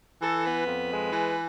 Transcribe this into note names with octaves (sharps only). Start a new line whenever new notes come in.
E3 A4
B3 B4
F2
G#3
E3